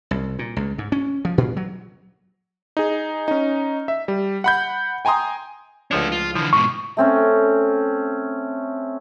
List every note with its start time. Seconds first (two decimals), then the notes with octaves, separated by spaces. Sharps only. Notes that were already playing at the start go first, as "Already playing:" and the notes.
0.11 C2
0.39 A#2
0.57 C#2
0.78 G#2
0.92 C#4
1.25 F3
1.38 A#2
1.57 F#3
2.77 D#4 G#4
3.28 C#4 D#4
3.88 E5
4.08 G3
4.44 F#5 B5 G6
5.05 G5 G#5 A#5 C6 D#6
5.91 C#2 F3 A3 D4 C#5
6.12 F4
6.35 D3 E3 F3
6.53 G#2 B2 C#6
6.97 A3 C4 C#4